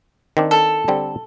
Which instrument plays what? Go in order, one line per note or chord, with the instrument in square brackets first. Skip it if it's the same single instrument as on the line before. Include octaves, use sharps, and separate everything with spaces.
[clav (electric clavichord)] D#3 C4 D4
[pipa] A4
[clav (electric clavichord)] D3 G3 C4